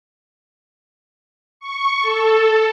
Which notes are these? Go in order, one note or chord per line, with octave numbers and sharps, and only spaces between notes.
C#6
A4